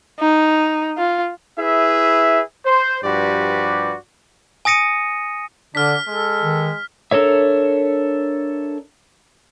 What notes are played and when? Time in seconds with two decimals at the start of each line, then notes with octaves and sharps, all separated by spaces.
0.20 D#4
0.98 F4
1.59 E4 G#4 B4 E5
2.66 C5
3.04 G2 F3 F#4 G4 B4 D5
4.65 G#5 D#6 A#6 C#7 D#7
5.75 D3 D4 F6 B6
6.07 G#3 A4
6.42 D#3
7.11 D4 A4 A#4 C#5 E5